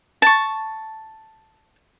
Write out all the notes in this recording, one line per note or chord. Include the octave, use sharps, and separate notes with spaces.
A5 C#6